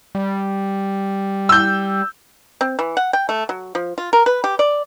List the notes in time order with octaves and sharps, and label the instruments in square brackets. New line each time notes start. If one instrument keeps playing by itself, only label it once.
[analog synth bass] G3
[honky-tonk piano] E6 G6
[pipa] C4
E3
F#5
G5
A3
F#3
F3
F4
A#4
B4
G4
D5